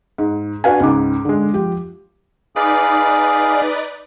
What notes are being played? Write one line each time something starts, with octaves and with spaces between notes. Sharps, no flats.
G#2
D4 F#4 B4 F5 G#5
C#2 G#2 D6
D3 G#3
F3 G4
D#4 G#4 B4 D5 F5